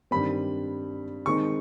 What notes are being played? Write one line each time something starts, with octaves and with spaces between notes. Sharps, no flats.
G2 D#3 G3 C4 B5
D#3 G#3 C4 D#4 C#6